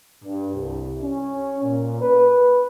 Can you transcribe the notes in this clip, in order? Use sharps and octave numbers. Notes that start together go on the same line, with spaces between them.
G2
C2
C#4
A#2
B4